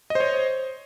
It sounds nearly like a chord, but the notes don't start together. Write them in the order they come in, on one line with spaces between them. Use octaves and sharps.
D#5 C5 C#5